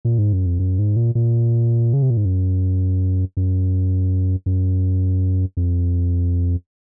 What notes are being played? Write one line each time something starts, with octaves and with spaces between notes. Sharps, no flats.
A#2
G#2
F#2
F2
F#2
G#2
A#2
A#2
C#3
C3
A#2
G#2
F#2
F#2
F#2
F2